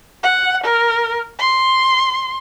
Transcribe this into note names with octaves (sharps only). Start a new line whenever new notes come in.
F#5
A#4
C6